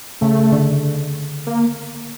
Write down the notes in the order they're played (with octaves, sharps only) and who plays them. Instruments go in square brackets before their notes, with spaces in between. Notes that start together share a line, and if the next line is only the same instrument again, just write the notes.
[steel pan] C#3 [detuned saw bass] A3
[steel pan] D3
[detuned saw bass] A#3